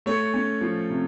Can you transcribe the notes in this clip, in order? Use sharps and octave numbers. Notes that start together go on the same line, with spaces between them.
A3 C#5
C#4
F3
C3